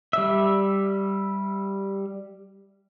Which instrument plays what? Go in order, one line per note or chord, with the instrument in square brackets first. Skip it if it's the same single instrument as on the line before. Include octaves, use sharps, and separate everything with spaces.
[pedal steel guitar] G3 E5